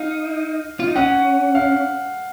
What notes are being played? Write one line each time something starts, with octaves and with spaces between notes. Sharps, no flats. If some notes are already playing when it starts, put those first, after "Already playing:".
Already playing: D#4 F5
F4
D#4
C#4 F#5
F5